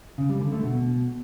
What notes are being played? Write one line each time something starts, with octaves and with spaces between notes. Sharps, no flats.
C#3
G3
D3
A3
B2